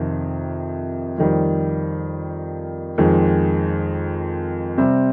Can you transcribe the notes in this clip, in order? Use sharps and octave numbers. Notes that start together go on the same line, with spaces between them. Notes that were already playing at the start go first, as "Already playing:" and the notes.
Already playing: F2 C3 D#3
F2 D#3 G3
F2 D#3 G#3
C3 G3 C4